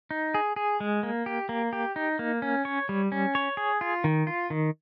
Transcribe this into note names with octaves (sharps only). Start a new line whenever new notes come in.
D#4
G#4
G#4
G#3
A#3
G4
A#3
G4
D#4
A#3
C#4
C#5
G3
C#4
C#5
G#4
F4
D#3
F4
D#3